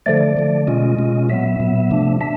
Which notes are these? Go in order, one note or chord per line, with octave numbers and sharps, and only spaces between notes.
D3 F3 A3 D5
D3 F3 A3
B2 G#3 C#4 F4 D#5
B2 G#3 C#4 F4
A#2 F#3 B3 E5
A#2 F#3 B3
C3 F3 A3 D4
D4 E5